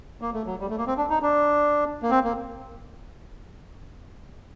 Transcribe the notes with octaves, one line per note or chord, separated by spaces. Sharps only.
A#3
A3
F#3
G3
A3
A#3
C4
D4
D#4
D4
A#3
C4
A#3